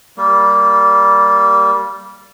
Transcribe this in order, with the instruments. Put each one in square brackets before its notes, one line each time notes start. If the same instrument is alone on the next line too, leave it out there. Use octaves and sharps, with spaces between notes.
[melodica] G3 A#3